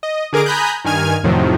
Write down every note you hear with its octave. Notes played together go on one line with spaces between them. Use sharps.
D#5
D3 G#4 A#4 D6 D7
G#5 A#5 B5 D#6 F#6 G6
G2 D#3 G#5 F6 G#6
F2 A2 C3 D#3 F3 F#3